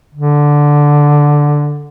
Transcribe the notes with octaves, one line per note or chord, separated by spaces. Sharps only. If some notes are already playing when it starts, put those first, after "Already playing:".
D3